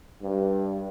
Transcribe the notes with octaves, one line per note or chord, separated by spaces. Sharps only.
G2